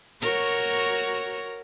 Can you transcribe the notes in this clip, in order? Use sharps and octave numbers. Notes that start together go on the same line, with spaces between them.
F#4 A#4 C#5